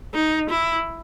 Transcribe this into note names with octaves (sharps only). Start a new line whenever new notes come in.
D#4
E4